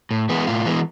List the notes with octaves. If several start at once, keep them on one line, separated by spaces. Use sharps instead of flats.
A2
E3 G#3 B3
A2 F4
E3 G#3 B3